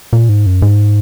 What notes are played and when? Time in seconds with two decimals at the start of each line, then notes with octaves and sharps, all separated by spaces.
0.13 A#2
0.29 G#2
0.46 F#2
0.62 G#2